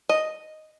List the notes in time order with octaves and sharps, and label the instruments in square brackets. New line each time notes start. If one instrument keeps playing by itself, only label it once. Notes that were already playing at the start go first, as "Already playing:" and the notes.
[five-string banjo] D#5